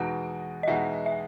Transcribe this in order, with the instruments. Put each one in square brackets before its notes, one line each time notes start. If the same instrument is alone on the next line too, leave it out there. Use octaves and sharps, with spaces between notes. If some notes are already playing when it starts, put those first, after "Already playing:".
Already playing: [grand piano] E2 B2 G#3 D#4 F#4 [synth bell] F#5
[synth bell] D#5
[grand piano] E2 B2 G#3 D#4 F#4 [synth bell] E5
[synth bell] E5